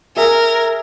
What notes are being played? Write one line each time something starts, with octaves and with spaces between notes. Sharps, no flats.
G#4 A#4 E5 G#5